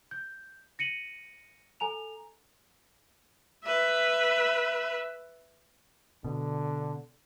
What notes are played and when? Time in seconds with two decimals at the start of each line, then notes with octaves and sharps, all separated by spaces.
0.11 G6
0.79 A#6 C#7 D#7 F#7
1.80 A4 G#5 A#5 F7
3.64 B4 E5
6.24 B2 D3